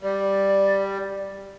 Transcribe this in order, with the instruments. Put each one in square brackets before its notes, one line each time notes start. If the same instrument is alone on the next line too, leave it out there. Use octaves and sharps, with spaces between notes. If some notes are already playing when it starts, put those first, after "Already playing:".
[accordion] G3 [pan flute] D5